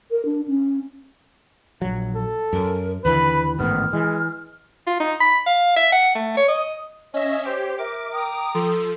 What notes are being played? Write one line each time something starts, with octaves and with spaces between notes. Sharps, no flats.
A#4
D4
C#4
A#1 F#3
A4
F#2 A#4
D#2 D3 E3 B4 B5
A1 G#2 D#3 B3 F6
E3 G#3
F4
D#4
B5
F5
E5
F#5
A3
C#5
D#5
C#4 C#5 D#5 E5
G4 C5
A#4 E5 D6
G5 A#5 D6 D#6
F3 A4 C6